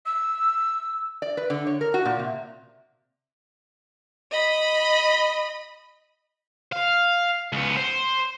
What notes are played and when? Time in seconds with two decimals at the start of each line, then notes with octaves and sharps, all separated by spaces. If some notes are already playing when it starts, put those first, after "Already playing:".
0.06 E6
1.22 D5
1.37 B4
1.50 D3
1.67 C#5
1.81 A#4
1.94 F#4
2.06 A#2
2.19 C3
4.31 D#5 B5
6.72 F5
7.53 C#2 B3
7.77 C5